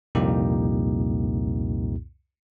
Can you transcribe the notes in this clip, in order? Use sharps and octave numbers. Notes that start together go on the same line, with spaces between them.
C2 F2 A#2 A#3 D#4 G4